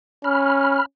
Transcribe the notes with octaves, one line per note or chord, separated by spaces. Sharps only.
C#4 B5 F6